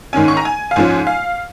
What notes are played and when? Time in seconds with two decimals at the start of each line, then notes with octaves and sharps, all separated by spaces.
0.13 G#2 D#3 C#4 G#5
0.28 C#6
0.37 A#5
0.45 G#5
0.71 F5
0.76 G#2 F3 C#4 G#5
1.07 F5